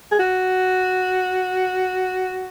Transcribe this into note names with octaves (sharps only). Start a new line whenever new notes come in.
G#4
F#4